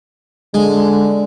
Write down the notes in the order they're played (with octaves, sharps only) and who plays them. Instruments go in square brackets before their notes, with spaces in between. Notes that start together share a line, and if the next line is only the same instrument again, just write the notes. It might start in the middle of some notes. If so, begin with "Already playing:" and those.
[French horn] D3 [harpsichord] G#3